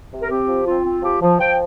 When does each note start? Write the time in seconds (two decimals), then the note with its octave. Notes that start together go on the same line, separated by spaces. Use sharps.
0.12 C3
0.22 A#4
0.30 C4 G4
0.48 F3
0.66 C4 F4
0.85 C4
1.03 F3 G4
1.21 F3
1.39 F3 G5